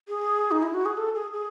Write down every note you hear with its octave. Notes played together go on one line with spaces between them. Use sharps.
G#4
D#4
E4
F#4
G#4
A4
G#4
G#4